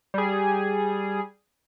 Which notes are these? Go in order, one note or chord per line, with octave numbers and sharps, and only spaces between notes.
G3 G#4